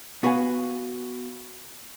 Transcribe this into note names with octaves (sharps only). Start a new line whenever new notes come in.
B3 F#4 B4 F5 G#5